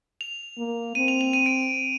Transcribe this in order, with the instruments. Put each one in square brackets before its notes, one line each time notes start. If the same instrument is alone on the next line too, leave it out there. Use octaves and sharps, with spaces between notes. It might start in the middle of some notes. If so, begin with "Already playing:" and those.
[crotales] F7
[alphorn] A#3
[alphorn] C4 [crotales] D#7
[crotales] F7
F7
D#7
D7